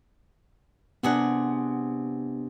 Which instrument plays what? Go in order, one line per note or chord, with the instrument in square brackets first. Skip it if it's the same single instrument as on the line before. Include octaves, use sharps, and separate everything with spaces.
[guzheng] C3 G#4 F#5 [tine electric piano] B3 D4